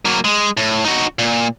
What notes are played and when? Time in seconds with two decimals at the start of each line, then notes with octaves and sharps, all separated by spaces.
0.05 F#3 A#3
0.24 G#3
0.57 A2
0.84 D#4 F#4
1.19 A#2